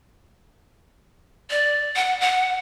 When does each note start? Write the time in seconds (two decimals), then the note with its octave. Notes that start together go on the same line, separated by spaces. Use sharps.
1.51 D5
1.96 F#5
2.21 F#5